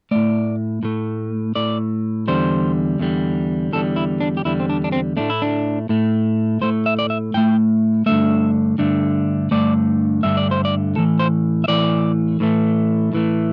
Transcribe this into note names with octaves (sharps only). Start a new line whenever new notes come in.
A2 A3 D5
A2 A3
A2 A3 D5
E2 D3 G3 C5
E2 D3 G3
E2 D3 G3 A4
E4
D4
G4
E2 D3 G3 E4
C4
D4
D4
C4
A2 A3 D4
E4
D4
A2 A3
A2 A3 C5
E5
D5
E5
A2 A3 G5
G2 D3 A3 E5
G2 D3 A3
G2 D3 A3 D5
G2 D3 A3 E5
D5
C5
D5
A2 E3 A3 A4
C5
E5
A2 E3 A3 D5
A2 E3 A3
A2 E3 A3